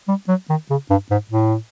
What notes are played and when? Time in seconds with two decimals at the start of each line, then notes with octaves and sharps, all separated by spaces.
0.08 G3
0.28 F#3
0.49 D#3
0.70 C#3
0.90 G2
1.11 G#2
1.31 A2